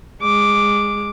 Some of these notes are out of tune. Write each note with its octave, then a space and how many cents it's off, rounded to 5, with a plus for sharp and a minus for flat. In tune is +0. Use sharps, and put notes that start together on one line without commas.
G#3 -15 D6 +0